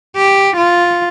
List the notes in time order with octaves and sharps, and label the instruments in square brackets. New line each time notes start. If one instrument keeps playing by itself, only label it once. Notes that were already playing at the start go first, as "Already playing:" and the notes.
[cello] G4
F4